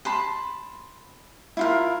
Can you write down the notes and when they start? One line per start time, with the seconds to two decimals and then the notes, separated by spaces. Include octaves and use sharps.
0.05 A5 B5 C6
1.57 E4 F4 A#4